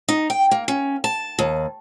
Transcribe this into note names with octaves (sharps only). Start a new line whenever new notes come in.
D#4
G5
A#3
C#4
A5
D#2